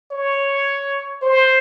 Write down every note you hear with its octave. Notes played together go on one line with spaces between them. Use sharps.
C#5
C5